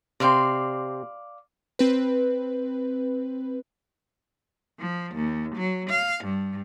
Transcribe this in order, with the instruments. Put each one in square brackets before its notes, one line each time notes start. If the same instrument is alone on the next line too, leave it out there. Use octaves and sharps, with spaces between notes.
[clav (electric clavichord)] C3 C4 [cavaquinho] D5 F5 C6
[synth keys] C4 B4
[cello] F3
D#2
F#3
F5
G2